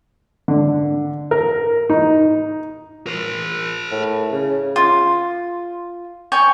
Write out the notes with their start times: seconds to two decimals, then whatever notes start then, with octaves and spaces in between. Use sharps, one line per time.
0.48 D3
1.31 A#4
1.90 D#4
3.07 A#4 C5
3.91 A2
4.32 C#3
4.76 F4
6.32 C#5 G5 G#5